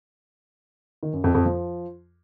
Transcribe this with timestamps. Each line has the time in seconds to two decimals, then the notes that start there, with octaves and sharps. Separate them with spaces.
1.03 D#3
1.13 F#2
1.24 F2
1.35 F2
1.45 F3